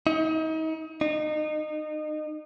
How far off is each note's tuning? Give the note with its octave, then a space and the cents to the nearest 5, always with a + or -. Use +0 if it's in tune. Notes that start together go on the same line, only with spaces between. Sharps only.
D#4 +35
D#4 -30